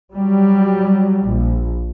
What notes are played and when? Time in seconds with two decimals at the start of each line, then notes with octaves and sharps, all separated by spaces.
0.14 F#3 G3
1.28 A#1